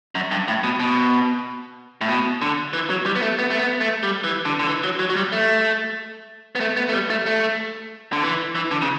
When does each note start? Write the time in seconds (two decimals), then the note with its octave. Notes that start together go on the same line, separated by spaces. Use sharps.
0.15 F#2
0.31 G2
0.48 A2
0.64 B2
0.80 B2
2.01 A2
2.08 B2
2.42 D3
2.73 E3
2.90 F#3
3.06 G3
3.16 B3
3.22 A3
3.39 B3
3.51 A3
3.59 B3
3.81 A3
4.03 G3
4.24 E3
4.45 D3
4.59 D3
4.67 E3
4.84 F#3
4.99 F#3
5.10 F#3
5.16 G3
5.32 A3
6.55 B3
6.60 A3
6.77 B3
6.89 A3
6.93 G3
7.10 A3
7.26 A3
8.13 D3
8.23 E3
8.55 E3
8.71 D3
8.82 C#3